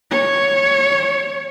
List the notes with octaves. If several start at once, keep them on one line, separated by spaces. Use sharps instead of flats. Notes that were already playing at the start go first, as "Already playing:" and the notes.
C#5